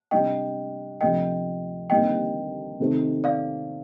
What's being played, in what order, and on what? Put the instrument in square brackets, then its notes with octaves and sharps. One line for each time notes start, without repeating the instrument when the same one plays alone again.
[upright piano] C3 G3 D4 [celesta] D#5 G5
[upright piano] D2 C3 F3 [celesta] D#5 G5
[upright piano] D#2 D3 G3 C4 [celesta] D#5 G5
[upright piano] C3 D#3 A3 C4
[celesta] D5 F5